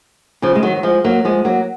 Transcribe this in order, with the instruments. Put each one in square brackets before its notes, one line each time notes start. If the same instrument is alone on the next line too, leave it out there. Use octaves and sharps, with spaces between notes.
[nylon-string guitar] C#3 F3
G#3
D#3 F#3
F#3
F3 G#3
F#3 A#3
F3 G#3
F#3 A#3